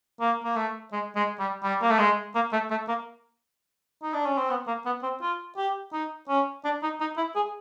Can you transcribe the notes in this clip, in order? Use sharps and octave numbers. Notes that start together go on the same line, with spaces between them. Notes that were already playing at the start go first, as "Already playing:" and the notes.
A#3
A#3
A3
G#3
G#3
G3
G3
A#3
A3
G#3
A#3
A3
A3
A#3
D#4
D4
C#4
C4
B3
A#3
B3
C4
F4
G4
D#4
C#4
D4
D#4
D#4
E4
G#4